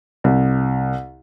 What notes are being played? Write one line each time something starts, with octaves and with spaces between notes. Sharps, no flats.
C2